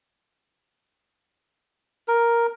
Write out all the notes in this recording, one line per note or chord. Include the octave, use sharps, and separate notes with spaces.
A#4